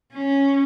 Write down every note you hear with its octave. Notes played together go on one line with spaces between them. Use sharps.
C#4